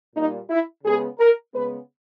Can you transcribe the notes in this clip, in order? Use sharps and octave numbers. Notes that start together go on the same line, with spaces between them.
A#2 G3 A#3 D#4
E4
C#3 G#3 B3 G#4
A#4
C#3 G#3 B3 B4